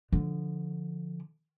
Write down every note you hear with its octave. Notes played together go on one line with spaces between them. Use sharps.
D3 F3